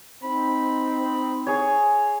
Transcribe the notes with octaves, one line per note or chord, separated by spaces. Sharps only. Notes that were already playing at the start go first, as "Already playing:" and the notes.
C4 D#4 B5
G#4 C#5